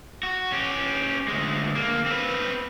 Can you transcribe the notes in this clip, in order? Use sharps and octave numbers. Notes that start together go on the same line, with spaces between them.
F#4
C#4 G4
D2 G#3
D3 A#3
C4 B4